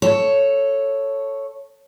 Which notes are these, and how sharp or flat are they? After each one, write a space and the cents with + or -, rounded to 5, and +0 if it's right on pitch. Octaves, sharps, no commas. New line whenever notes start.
A4 +0 C#5 +0